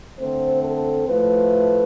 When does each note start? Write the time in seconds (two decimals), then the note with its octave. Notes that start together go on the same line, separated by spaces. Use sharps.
0.18 D3 A3 C4 C5
0.63 A4
1.08 A2 F3 A3 B4